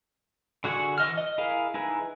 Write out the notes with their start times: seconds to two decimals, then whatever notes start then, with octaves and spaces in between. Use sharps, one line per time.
0.64 D3 F#4 G#4 F#5 C#6
0.98 E3 D#5 F6
1.18 D#5
1.38 E4 G#4 A#4 F5
1.74 D#4 E4 G#4 B4